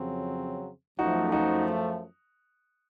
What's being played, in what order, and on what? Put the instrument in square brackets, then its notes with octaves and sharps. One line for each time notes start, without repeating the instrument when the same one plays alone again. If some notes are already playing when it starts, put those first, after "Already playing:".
Already playing: [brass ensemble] F2 C#3 F#3 C4
[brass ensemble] F#2 F3 A3 [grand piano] D#4 F#4
[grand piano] D#4 F#4